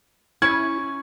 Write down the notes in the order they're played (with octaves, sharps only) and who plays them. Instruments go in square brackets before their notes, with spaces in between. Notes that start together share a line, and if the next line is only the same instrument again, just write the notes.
[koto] C#4 [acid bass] E4 [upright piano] G#6